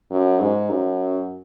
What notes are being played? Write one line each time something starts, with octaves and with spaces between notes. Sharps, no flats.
F#2
G#2
F#2